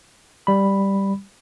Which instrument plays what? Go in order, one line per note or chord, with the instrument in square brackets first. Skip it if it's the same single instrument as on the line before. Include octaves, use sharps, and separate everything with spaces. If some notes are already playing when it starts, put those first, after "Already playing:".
[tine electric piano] G3 B5